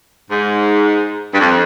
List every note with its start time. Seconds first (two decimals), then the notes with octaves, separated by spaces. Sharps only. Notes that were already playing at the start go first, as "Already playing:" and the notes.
0.30 G#2
1.32 G2
1.39 F2